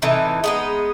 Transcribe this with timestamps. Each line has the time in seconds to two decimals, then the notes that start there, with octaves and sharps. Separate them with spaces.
0.02 A2 C3 E3 D#4
0.44 G#3 B3 D#4